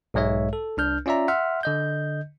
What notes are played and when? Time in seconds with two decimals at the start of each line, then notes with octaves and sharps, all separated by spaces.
0.14 B1 G#2 G#3 C#5 E5
0.53 A4
0.77 C2 D4 F6 G6
1.06 C#4 F4 D5 E5 A#5
1.28 E5 F#5 C6 F6
1.63 D3 D#5 G6